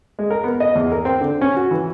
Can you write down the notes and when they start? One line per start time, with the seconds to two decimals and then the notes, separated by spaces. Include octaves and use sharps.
0.19 G#3
0.30 A#4
0.44 B3
0.60 D#5
0.75 E2
0.92 A#4
1.05 C4
1.21 D3
1.41 C#4
1.56 F#4
1.71 E3